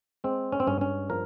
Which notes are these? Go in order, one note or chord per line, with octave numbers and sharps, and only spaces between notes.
G#3 C4
C#4
C4
G2 C#4
C#4
F3 A#4